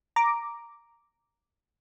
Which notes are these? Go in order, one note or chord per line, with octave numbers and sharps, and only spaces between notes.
A#5 D6